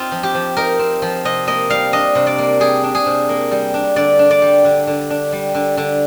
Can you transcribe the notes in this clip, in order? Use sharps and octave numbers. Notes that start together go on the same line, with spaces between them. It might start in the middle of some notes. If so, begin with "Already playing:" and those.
Already playing: C4 D#4 F4
F3
G4
F3
D#4 A#4
C4
F3
C3 D#5
A#3 D#5
G3 F5
D4 D#5
C3
D5
A#3
G3 G#4
D4
G#4
C3
A#3
G3
D4
D3 D5
D4
D5
G3
D3
D3
D4
G3
D3
D3